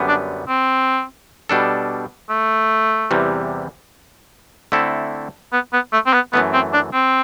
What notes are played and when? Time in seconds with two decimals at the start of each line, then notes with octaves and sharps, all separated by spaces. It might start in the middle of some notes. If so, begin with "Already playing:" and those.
Already playing: F#2 D3 G3 B3
0.08 D4
0.49 C4
1.49 B2 G3 D4 A4
2.30 A3
3.11 E2 C3 E3 G3
4.72 D3 A3 C4 E4 A4
5.53 B3
5.73 B3
5.93 A3
6.06 C4
6.13 B3
6.33 F#2 E3 A3 B3
6.54 C4
6.73 D4
6.93 C4